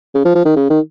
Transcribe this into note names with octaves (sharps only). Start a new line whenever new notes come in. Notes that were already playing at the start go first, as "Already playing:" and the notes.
C#3
F3
F3
D#3
C#3
D#3